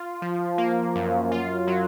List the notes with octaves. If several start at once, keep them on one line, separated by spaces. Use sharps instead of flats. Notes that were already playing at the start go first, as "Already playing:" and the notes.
Already playing: F4
F3
A#3
F#2
F4
F#3